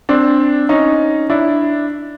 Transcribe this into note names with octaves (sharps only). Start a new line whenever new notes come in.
C4 D4
C#4 D#4
D4 E4